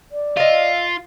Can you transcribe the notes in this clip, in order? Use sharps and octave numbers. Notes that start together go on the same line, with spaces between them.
D5
F4 D#5 E5